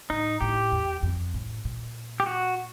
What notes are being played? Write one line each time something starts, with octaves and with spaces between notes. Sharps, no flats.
A2 D#4
A2 G4
E2
F2
A2
A#2
G4
F#4